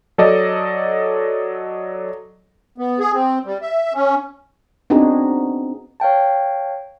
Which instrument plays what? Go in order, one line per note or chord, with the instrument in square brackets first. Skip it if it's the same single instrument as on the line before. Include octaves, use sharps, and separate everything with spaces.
[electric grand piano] F#3 A4 D5 D#5
[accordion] B3
G#4
C4
G3
E5
C#4
[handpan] B3 C4 D4 D#4 F#4 G#4
[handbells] C#5 F5 G5 A5